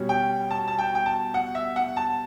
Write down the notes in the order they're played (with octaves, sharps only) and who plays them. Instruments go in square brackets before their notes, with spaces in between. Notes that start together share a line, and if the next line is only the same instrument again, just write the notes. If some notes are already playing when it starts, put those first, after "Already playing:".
Already playing: [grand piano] B2 G3 C#4
G5
A5
A5
G5
G5
A5
F#5
E5
F#5
A5